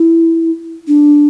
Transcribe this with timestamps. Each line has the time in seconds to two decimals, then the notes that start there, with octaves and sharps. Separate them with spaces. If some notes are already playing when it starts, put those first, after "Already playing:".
Already playing: E4
0.88 D4